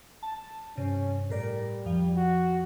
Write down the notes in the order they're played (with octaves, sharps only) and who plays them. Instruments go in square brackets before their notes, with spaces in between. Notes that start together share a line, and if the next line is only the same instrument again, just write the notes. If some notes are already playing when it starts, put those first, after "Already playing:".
[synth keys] A5
[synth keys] G2 C3 [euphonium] C#4
[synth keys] A2 A#4 D5 [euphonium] G3
[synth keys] F2 F3
[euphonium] F#4